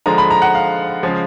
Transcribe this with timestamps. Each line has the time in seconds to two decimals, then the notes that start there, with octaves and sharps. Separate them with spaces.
0.06 D3 F3 G#3 A#5
0.18 B5
0.31 A#5
0.42 F#5
0.55 F5
1.03 C#3 F3 G#3